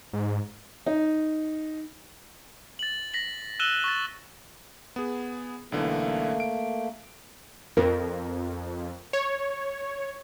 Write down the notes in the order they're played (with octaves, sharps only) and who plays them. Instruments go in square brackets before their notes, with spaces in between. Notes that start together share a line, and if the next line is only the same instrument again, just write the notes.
[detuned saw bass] G#2
[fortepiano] D#4
[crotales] A6 F#7
A#6 B6 F#7
E6 F#6 D#7 E7 F#7 G7
C#6 A6
[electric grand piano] B3 G#4
[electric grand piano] B1 D3 E3 [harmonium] A3 A#3
[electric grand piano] D7
[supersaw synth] F2 [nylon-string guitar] A#4
[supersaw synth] C#5